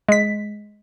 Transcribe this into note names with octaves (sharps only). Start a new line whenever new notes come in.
G#3 B6